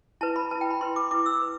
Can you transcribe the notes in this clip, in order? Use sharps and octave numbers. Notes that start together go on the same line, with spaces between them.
E4 B4 A5
B5
E4 B4 A5
G5
B5
E4 B4 C6
D6
E4 B4 D6
E6
B4